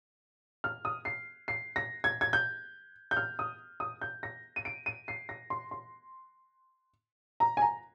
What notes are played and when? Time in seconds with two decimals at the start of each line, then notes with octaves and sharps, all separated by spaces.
0.64 F6
0.85 D#6
1.05 C7
1.48 C7
1.76 A#6
2.04 G#6
2.21 G#6
2.33 G6
3.11 G6
3.17 F6
3.39 D#6
3.80 D#6
4.01 G6
4.23 A#6
4.56 D#7
4.65 D7
4.86 D#7
5.08 C7
5.29 A#6
5.50 C6
5.71 C6
7.40 A#5
7.57 G#5
7.62 A#5